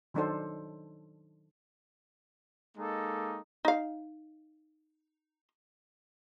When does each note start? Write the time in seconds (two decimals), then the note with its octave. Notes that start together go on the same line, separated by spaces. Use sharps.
0.14 D#3 F#3 D4 D#4 A4 C5
2.77 G#3 A#3 D#4 A4
3.65 D#4 F5